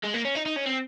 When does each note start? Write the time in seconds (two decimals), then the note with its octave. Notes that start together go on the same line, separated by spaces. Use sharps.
0.04 G#3
0.14 A#3
0.25 C#4
0.35 D#4
0.46 D#4
0.56 C#4
0.66 C4